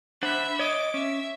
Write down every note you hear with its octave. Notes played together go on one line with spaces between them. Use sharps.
D4 C5 E5 F#5 B5
C#5 D#5 D6
C#4 E5